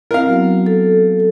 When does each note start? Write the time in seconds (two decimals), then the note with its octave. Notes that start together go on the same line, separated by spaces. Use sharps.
0.11 C4 E4 A#4 F5
0.27 F#3 B3 F#4
0.66 A4